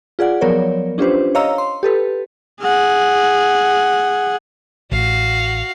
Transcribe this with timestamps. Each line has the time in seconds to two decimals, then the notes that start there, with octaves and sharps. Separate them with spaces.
0.19 F4 G#4 D5 F#5
0.41 F3 F#3 B3 A#4 C#5 D5
0.98 C#4 D4 F4 G4 B4 C5
1.35 C#5 D#5 F5 A#5 E6
1.58 C6
1.83 G4 A4 B4
2.61 G#4 F#5
4.92 A1 F#4 F5